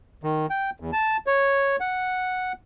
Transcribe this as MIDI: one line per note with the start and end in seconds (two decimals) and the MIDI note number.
0.24 0.46 51
0.50 0.70 79
0.80 0.91 40
0.93 1.17 81
1.27 1.76 73
1.80 2.53 78